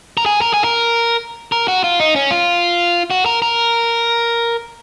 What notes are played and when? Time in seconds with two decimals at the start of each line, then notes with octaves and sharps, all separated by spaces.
0.17 A#4
0.26 G#4
0.41 A#4
0.54 G#4
0.64 A#4
1.52 A#4
1.68 F#4
1.84 F4
2.00 D#4
2.16 C#4
2.31 F4
3.11 F#4
3.26 A#4
3.42 A#4